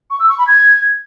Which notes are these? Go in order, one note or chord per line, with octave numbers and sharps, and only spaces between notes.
C#6
E6
C#6
B5
G#6